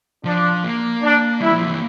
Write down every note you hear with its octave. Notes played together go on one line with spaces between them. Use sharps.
F3 D4
A#3
D4
G3 E4
F3
E3